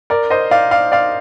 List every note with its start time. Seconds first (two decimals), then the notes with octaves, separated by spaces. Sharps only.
0.10 A#4 D5
0.30 C5 D#5
0.51 D5 F5
0.71 D5 F5
0.92 D5 F5